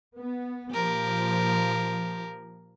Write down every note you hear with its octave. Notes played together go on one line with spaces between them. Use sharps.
B3
A#2 F3 G4 A#4